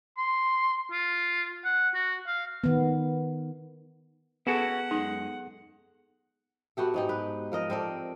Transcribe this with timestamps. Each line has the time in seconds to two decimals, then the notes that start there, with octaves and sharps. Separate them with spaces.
0.18 C6
0.92 F4
1.65 F#5
1.94 F#4
2.27 F5
2.64 D#3 B3
4.47 B3 C#4 E4 F#4 G#4 A4 F#5
4.91 F#2 G#3 D#4
6.77 B3 F#4 G4 A4
6.94 G#2 D#4 G4
7.09 B4
7.52 F3 A#4 D#5
7.70 C4 A4 A#4 D5